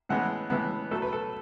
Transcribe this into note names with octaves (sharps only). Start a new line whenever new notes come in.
A2 E3 G#3 B3 F#5
A2 E3 G#3 B3
B2 F#3 A3 A4
B4
A4